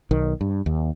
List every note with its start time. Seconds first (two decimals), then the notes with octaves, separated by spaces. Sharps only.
0.11 B1 D#3
0.41 G2
0.66 D#2